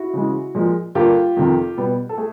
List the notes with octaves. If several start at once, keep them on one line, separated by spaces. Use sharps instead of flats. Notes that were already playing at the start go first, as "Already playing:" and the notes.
Already playing: E4 F#4
C#3 E3 G#3
A#2 F3 G#3
G2 D3 G3 A#3 F4 G4
F2 C3 D#3
B2 G3 B3
A4
A3 G#4